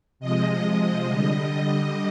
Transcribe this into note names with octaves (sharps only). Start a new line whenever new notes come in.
C3 F3 G#3 D#5
D3 G3